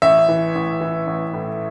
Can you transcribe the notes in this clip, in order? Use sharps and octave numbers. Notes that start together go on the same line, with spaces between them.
A1 E5
E3
A1
E3
A1
A2